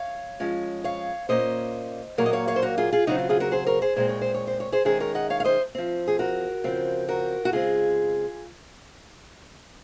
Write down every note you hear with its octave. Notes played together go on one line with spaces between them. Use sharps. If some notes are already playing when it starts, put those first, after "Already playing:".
Already playing: C#5 F5
F3 G#3 C#4
C#5 F5
A#2 F3 A#3 C#4 C5 D#5
A#2 F#3 A#3 A#4 C#5
D#5
C#5 F5
C#5 F5
C5
F#4 A#4
F4 G#4
F4 G#4
C#3 F#3 C4 D#4 F#4
F4
F4 G#4
F#4 A#4
G#4 C5
A#4 C#5
G#4 C5
A#2 G#3 C4 C5
C#5
C5
C#5
C5
C#5
G#4 C5
D#3 G#3 C#4 G#4 C5
A#4 C#5
D#5 F#5
C#5 F5
F5
C5 D#5
F3 C4
G#4
F#4 A#4
C#3 F3 C4
F#4 A#4
F#4
C#3 G#3 C4 F4 G#4